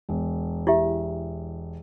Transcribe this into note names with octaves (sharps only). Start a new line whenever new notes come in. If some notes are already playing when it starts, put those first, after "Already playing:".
E1
E4 G4 E5